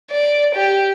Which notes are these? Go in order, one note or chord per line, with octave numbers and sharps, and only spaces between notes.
D5
G4